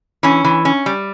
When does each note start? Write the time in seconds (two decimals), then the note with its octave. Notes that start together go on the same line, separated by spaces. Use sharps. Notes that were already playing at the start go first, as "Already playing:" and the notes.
0.23 E3 C#4
0.45 E3
0.65 C#4
0.86 G3